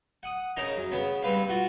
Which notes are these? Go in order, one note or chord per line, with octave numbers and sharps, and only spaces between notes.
F#5 D#6
C#3 D#4 A#4 A#5
F#2
C#3 B3
G2 C4 B4 F5
F4 F#4 F#5